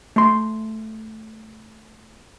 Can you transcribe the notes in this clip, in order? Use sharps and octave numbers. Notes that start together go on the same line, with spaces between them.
A3 C6